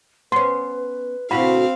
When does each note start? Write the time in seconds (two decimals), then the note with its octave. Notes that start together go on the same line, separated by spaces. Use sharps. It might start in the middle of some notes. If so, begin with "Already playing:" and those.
0.32 B3 C#4 B4 C6
1.31 D2 B2 C4 E4 F#4 F5 B5